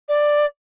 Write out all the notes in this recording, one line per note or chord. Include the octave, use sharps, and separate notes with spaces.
D5